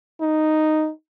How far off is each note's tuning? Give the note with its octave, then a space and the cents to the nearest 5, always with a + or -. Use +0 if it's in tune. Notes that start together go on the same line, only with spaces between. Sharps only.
D#4 -5